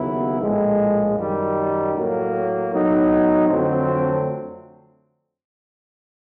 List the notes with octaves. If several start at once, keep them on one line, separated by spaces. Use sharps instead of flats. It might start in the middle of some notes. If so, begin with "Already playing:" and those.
Already playing: D#2 C#3 F#3 B3 E4
A#1 A2 F3 G#3
F#2 D#3 G3
A2 F#3 A#3
A2 F#3 B3 D#4
F2 D3 F#3 A3 C4